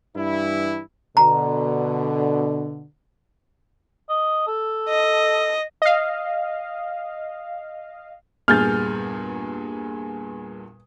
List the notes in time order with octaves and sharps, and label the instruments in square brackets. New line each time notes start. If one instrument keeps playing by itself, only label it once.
[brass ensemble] G2 E3 E4
[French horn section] B2 D3 [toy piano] A#5
[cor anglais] D#5
A4
[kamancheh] D#5
[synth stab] D#5 F5
[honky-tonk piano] E2 G2 A#2 [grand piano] G#4 [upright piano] F6 G6 A6